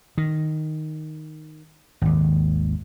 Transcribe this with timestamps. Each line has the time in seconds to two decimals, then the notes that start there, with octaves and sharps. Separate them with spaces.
0.17 D#3
2.02 G#1 D#2